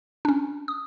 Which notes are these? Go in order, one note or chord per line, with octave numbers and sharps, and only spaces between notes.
C#4 D4
D#6